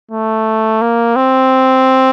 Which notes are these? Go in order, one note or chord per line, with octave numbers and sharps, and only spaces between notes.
A3
A#3
C4